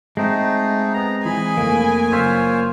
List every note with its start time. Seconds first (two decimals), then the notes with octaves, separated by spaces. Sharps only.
0.17 G#3 A3 C4 D#4
0.94 B3 G#5 A#5
1.25 E3 G#4 G#5 B5
1.57 F1 A3 A#3
2.11 F#1 F4 C5 C#5 E6 B6